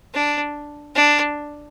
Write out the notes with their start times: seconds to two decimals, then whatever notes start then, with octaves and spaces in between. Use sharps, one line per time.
0.14 D4
0.95 D4